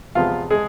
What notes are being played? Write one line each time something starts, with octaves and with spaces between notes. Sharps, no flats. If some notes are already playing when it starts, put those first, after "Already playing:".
E2 C3 F3 G#3 B3 F4 F5
G#3 G#4